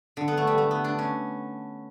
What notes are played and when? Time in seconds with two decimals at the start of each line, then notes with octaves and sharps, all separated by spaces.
0.17 D3
0.28 B3
0.37 A3
0.47 G3
0.58 A3
0.71 B3
0.84 D4
0.99 C#4